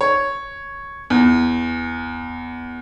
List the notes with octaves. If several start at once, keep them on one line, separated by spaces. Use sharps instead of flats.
C#5
E2